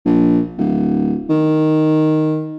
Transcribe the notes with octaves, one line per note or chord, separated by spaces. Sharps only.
A#1
D1
D#3